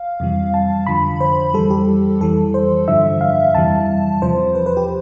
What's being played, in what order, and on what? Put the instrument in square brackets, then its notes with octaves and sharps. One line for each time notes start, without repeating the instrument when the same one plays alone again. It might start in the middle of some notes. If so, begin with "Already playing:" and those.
Already playing: [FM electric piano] F5
F2 C3 E3 G3
A5
F2 D3 F3 B5
C5
F2 E3 G3 A4
G4
F2 E3 G3 A4
C5
G2 D3 F3 E5
F5
F2 C3 E3 G3 A5
E2 C3 F3 C5
B4
B4
G4